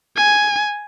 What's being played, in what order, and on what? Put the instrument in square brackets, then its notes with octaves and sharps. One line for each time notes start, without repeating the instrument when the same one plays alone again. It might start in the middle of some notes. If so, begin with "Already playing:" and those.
[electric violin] G#5